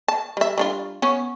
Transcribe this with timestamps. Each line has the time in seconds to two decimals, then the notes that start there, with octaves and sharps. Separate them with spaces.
0.08 A5
0.37 G3 E5
0.58 G3 D4 F4
1.02 B3 C#4 C#5